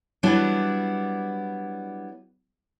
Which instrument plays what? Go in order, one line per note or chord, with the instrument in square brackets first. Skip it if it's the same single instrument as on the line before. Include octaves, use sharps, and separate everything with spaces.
[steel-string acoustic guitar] F#3 G3 B3 D4 E4